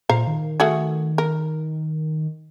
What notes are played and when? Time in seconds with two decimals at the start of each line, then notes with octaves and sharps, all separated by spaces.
0.09 A#2 C5 F5 A#5
0.27 D#3
0.60 A3 F#4 G#4
1.18 A#4